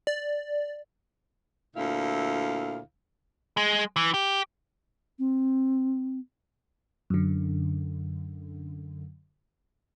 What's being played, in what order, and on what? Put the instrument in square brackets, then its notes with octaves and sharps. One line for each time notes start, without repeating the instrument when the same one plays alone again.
[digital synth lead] D5
[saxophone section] D2 A#2 E4 F5
[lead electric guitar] G#3
E3
G4
[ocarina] C4
[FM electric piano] F#2 D3